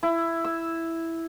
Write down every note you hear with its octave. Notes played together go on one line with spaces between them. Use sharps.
E4
E6